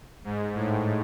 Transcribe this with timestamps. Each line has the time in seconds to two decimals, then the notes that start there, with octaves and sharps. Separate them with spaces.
0.24 G#2
0.54 A2